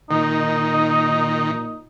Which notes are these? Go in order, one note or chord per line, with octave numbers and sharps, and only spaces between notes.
A#2 D#3 D#4